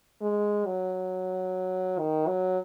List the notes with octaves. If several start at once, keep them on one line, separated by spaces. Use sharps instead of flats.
G#3
F#3
D#3
F#3